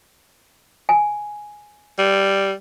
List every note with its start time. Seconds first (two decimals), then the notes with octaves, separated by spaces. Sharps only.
0.89 G#5
1.99 G3